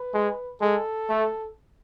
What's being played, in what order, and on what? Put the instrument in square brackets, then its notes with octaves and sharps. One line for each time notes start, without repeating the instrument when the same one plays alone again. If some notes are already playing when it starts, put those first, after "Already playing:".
Already playing: [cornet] B4
[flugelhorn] G#3
[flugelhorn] G#3 [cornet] A4
[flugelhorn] A3